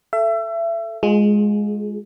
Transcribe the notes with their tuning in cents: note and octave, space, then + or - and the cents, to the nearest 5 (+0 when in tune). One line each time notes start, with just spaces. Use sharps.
A4 +0 E5 +30
G#3 +0 F4 +25 G#4 +30